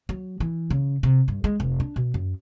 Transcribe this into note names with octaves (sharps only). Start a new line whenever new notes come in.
F#3
E3
C#3
C3
G2
G#3
F1
D4
B2
F#2